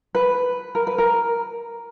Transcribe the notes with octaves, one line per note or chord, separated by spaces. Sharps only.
B4
A#4
B4
A#4